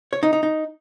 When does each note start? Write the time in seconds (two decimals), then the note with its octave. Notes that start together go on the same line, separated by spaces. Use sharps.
0.13 C#5
0.23 D#4
0.33 D#4
0.43 D#4